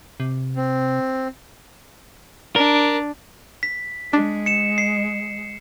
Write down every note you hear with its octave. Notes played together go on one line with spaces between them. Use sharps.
C3
C4
D4 A#4
B6
G#3 D4
C#7 E7
C7